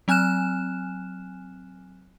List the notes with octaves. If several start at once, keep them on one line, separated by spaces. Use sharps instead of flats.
F#3 C4 G#5 F6 F#6 E7